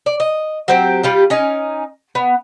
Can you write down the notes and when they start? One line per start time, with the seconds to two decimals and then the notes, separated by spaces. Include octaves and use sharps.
0.06 D5
0.20 D#5
0.68 F#3 C4 G4
1.03 G3 F4 G4
1.30 C#4 D#4 G#5
2.15 B3